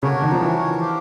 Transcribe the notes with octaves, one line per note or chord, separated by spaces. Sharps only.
C#3 D4 F#4 A#4 C#5
D#3
F3
E3
D4 G4 C5 F5